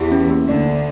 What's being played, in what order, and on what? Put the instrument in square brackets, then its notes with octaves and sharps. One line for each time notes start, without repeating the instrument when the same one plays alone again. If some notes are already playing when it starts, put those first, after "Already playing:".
Already playing: [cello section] E2 E3 [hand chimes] G4
[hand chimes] C#4
A#3
[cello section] D2 D3 [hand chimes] D5
[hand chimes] D4